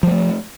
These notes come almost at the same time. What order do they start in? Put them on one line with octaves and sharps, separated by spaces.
F3 G3 A3